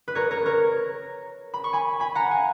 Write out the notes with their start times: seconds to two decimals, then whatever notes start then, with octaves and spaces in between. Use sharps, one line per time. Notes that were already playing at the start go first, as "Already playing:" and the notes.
0.08 B4
0.15 A#4 C#5
0.31 A#4 C#5
0.46 A#4 C#5
1.54 B5
1.64 C#6
1.73 G#5 B5
2.00 G#5 B5
2.15 F#5 A#5
2.31 F5 G#5